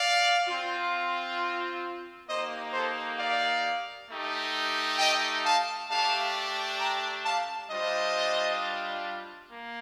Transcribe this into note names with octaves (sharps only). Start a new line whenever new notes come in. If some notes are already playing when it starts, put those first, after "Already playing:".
Already playing: D5 F5
C4 F4
A#3 D#4 G4 C5 D#5
A4 C5
D5 F5
A3 D#4 G4
D#5 G5
F5 A5
A3 D4 G4 F5 A5
G5 A#5
F5 A5
G3 D4 F4 C5 D#5
A#3